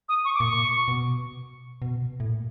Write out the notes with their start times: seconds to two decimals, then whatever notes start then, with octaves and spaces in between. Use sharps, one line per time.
0.09 D#6
0.25 C#6
0.35 D6
0.40 A#2 C#6
0.88 B2
1.82 B2
2.20 A2
2.29 A#2